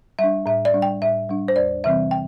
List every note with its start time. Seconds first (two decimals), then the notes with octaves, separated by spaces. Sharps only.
0.19 G3 D4 E5
0.46 A2 E5
0.65 D5
0.74 G3 D4
0.82 G5
1.02 A2 E5
1.29 G3 D4
1.48 C5
1.56 E2 D5
1.84 C3 E3 G3 C4 E5
2.11 G5